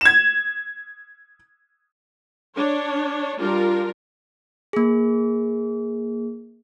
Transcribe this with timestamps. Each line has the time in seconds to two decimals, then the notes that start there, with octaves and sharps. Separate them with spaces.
0.01 G#6 E7
2.54 D4 C#5
3.40 G3 D4 F4 A#4
4.73 A#3 G#4